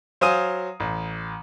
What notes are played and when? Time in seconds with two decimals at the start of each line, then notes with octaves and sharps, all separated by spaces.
0.21 F#3 C5 F5 G#5 D#6 D#7
0.80 A1